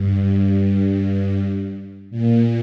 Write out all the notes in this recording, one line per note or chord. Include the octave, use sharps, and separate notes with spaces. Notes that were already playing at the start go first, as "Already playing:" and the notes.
Already playing: G2
A#2